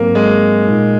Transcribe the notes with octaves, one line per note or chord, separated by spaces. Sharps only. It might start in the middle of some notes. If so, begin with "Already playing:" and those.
Already playing: G#2 F#3 A#3 C4
G#3
A#2 G#3 D#4